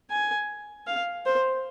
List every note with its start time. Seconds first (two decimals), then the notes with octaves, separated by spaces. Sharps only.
0.10 G#5
0.87 F5
1.26 C5